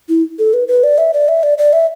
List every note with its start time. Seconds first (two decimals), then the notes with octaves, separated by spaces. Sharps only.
0.09 E4
0.39 A4
0.54 B4
0.68 B4
0.83 D5
0.98 E5
1.13 D5
1.28 E5
1.43 D5
1.58 D5
1.73 E5